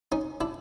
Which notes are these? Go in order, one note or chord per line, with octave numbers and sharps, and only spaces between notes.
C#4 D#4
D4 E4